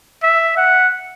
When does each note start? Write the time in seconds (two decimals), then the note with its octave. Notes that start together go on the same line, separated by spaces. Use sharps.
0.23 E5
0.57 F#5